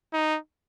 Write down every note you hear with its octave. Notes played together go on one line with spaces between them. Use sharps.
D#4